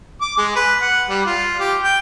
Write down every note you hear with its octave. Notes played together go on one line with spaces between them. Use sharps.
D6
G#3
B4
F#5
G3
F4
G4
G5